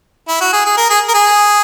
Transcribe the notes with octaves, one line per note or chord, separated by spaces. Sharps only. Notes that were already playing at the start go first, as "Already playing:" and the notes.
E4
F#4
G#4
G#4
A#4
G#4
A#4
G#4